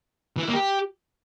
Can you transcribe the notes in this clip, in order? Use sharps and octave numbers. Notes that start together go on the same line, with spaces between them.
E3
E4
A#3
G4